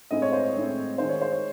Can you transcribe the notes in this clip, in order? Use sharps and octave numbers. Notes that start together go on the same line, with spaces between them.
A2 G#3 C4 E4 D#5
C#5
C5
C#5
A2 G#3 C4 E4
D#3 G#3 D#4 C5
C#5
C5
C#5